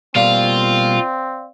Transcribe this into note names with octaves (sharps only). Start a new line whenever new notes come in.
B2 G3 A#3 C4 F4 D5 F5